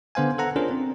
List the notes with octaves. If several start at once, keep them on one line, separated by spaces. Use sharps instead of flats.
D3 B3 C5 F5 G#5
A4 F#5 A#5
C#4 D4 F4 G#4 A#4 C5
C4